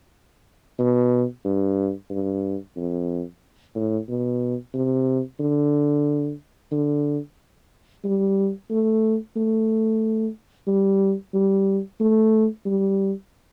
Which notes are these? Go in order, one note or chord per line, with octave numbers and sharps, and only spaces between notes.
B2
G2
G2
F2
A2
B2
C3
D3
D3
G3
A3
A3
G3
G3
A3
G3